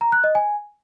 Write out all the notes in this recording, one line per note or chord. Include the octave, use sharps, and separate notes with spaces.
A#5
F#6
D#5
G#5